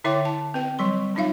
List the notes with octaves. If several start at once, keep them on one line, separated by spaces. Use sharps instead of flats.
D3 E4 C#5 E5 G5 D6
A5
C4 B4 G5
F#3 G3 C6
F#3 D4 D#4 F4 E5 F5